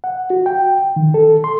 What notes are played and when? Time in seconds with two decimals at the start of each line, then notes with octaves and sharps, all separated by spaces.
0.04 F#5
0.30 F#4
0.46 G5
0.96 D#3
1.14 A4
1.44 C6